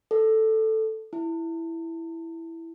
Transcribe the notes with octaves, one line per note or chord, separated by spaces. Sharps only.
A4
E4